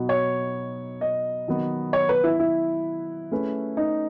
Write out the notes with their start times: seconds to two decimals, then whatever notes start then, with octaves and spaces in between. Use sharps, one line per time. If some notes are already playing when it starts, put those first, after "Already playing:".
Already playing: B2 F#3 B3 D#4 F#4
0.09 C#5
1.01 D#5
1.48 D#3 F#3 B3
1.93 C#5
2.09 B4
2.24 E4
2.39 E4
3.31 A3 C#4 G#4 B4
3.77 D#4